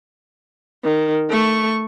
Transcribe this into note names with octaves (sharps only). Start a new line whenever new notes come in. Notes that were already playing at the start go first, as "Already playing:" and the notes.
D#3
A3 C#6